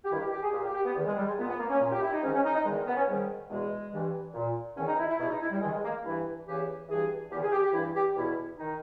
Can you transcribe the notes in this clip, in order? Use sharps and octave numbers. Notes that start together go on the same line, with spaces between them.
G4
G2 D#3 E4
G4
G4
G#4
A#2 G4
G4
G4
B3
E2 D#3
G#3
G3
G#3
A#2 B3
B3
A#3
C#4
A#2
G4
E4
D#4
G#2 D#3 C#4
C#4
D#4
D#4
E2 D#3 G#3
B3
C#4
G#2 D#3 G3
E2 B2 G#3
G2 E3
A#2
E2 D#3 C#4
D#4
E4
E4
E2 B2 E4
D#4
E4
G3
G2 D#3 G#3
G#3
A#3
G2 E3 E4
E2 C#3 E3 G4
G2 E3 G#4
E2 D#3 G4
G#4
G4
G4
G2 E3 E4
G4
E2 B2 E4
D#3 D#4